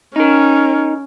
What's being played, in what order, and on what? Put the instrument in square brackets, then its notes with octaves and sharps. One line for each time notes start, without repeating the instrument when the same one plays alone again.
[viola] C#4 [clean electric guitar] D#4 A#4